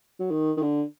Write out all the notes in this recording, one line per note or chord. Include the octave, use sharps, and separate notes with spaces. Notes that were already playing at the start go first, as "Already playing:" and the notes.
F#3
D#3
D#3
D3